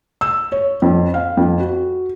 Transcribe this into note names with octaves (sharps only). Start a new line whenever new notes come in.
E6
C#5
F2
F5
F2
F#4